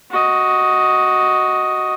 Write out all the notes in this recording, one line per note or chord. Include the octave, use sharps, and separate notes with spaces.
F#4 D#5